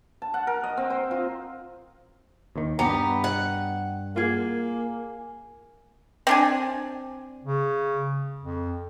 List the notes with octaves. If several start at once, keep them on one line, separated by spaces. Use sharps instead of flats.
A5
F#5
A#4
D#5
C4
C5
F4
D#2 D#3
G2 B3 G4 A#5
F#5
A#3 F4 G#4
C4 D4 G#5
C#3
F2